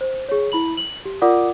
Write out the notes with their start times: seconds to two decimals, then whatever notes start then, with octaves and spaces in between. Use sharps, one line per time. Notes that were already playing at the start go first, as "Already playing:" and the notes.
0.01 C5
0.29 G#4 C#5
0.52 E4 B5 F#7
0.77 F#7
1.06 G4
1.21 F4 A#4 D5 F#5 D6 D#6